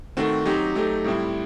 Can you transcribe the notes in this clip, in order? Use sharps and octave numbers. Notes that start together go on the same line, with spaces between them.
D#3 A3 C4 F#4
F#3 C4 D#4 G4
F#3 A3 D#4 G4
A2 G3 C4 E4